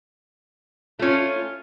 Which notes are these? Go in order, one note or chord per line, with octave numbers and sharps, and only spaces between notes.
A3 C#4 F4